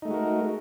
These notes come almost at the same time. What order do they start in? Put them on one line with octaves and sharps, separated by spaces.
D#4 A3 G#3 F#4 A#4